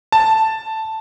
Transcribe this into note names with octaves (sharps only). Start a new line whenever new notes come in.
A5